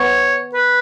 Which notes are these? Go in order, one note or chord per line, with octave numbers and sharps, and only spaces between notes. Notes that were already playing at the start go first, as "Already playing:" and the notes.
Already playing: B3 C#5
B4